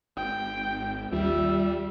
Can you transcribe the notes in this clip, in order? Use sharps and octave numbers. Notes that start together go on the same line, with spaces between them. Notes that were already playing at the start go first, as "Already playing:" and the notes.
G#1 G5
D#2 G3 F4 E5